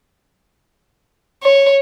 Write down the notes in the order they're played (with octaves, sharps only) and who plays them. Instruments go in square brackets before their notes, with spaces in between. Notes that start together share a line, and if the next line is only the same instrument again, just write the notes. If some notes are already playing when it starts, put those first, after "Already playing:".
[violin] C#5